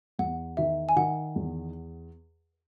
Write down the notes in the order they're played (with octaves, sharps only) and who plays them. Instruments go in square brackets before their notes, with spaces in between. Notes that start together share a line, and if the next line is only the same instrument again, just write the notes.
[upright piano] E2 [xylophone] F#5
[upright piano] D#3 [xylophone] E5
[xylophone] G#5
[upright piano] D#3 [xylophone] F#5
[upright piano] E2